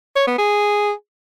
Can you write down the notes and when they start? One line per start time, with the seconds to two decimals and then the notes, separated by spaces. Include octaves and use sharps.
0.16 C#5
0.27 B3
0.38 G#4